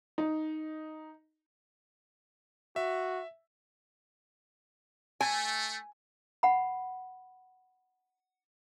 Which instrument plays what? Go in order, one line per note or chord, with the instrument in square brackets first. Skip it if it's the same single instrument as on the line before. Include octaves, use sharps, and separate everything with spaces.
[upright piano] D#4
[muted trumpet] F#4 [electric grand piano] E5
[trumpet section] A3 [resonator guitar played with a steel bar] G#5
[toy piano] F#5 B5